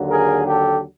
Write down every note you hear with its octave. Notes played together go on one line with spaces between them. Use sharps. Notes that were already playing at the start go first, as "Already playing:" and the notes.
Already playing: D#2 D3 F#3
G#4 A#4
G4 A4